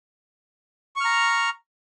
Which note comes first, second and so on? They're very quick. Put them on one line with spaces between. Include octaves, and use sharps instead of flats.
C#6 F6 A#5